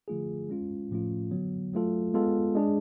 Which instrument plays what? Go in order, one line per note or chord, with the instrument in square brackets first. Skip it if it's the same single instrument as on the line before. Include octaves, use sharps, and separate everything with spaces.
[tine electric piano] D3 F3 A3 F4 G#4
G#3 C#4 F4
A2 F3 A3 C#4 F4
D3 F#3 B3
F#3 A3 F4 A4
G#3 B3 F4 A4
G#3 D4 G#4